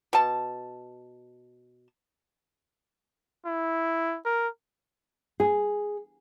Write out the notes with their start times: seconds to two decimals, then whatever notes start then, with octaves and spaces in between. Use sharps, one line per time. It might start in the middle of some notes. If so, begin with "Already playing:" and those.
0.13 B2 A5
3.45 E4
4.25 A#4
5.40 G#4